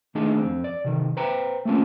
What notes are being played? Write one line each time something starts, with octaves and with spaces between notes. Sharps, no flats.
D#3 A3 D4 D#4 G#4
F2 C4
D5
C3 D#3
B4 C5 G5 A#5
A3 A#3 C4 C#4 F4